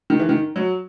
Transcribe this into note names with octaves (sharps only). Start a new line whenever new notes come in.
D#3
E3
D#3
F#3